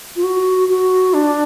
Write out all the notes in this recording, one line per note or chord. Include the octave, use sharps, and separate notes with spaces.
F4
F#4
F#4
D4